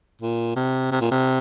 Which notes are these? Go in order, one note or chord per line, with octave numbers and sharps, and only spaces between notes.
A#2
C3
C3
A#2
C3